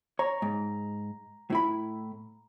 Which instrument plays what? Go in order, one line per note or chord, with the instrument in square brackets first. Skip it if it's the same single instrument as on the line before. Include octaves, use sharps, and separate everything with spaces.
[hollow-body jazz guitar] C#5 [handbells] A#5
[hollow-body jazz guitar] G#2
A2 E4 B5